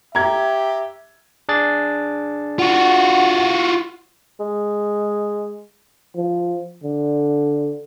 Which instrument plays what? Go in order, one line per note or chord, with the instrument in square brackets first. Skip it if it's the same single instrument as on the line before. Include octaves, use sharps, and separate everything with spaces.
[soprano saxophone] G4 [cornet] E5 [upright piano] A#5 G#6
[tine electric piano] D4 G#4 A6
[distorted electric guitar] F4 F#4 [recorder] F#5
[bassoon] G#3
[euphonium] F3
D3